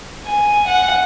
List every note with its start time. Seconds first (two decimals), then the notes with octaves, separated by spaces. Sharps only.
0.25 G#5
0.68 F#5